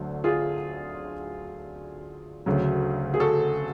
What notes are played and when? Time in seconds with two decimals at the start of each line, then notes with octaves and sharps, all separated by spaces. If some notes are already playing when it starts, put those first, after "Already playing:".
Already playing: D2 D3 F#3
0.24 F4 G#4
2.46 D2 C#3 F#3
3.14 G#4
3.20 F#4 A4